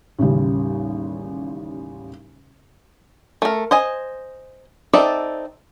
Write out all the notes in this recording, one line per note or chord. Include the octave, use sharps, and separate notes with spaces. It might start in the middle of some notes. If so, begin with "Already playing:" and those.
A1 D#2 C#3 G3
A3 A#4
C5 D#5 G#5
C4 D#4 A4 D5 E5